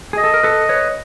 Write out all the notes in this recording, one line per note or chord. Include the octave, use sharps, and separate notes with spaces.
G#4 D#5
A4
A#4
A4 B4
B4 C#5